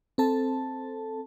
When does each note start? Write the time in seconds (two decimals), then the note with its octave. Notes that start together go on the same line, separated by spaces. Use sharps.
0.18 C4 A4 A5